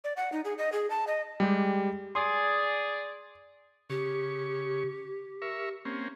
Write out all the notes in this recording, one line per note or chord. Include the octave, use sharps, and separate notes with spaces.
D5
F#5
D#4
G#4
D#5
G#4
A5
D#5
G3 G#3 G4
G#4 D5 C6
C#3 G4 C#6
A#4 E5 C#6
A#3 C4 C#4